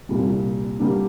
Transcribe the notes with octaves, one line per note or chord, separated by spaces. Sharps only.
C2 A#2 G3
D3 G3 A#3 D4